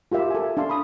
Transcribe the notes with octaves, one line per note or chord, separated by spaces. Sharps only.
F4 G4 A#4 E5
A4 G#5
D4 F5 A5 C6
B5 D#6